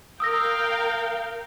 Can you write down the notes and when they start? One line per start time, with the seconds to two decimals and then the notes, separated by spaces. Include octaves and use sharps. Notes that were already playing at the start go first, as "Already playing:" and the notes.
0.20 A#4 F5 G5 D#6 E6 A#6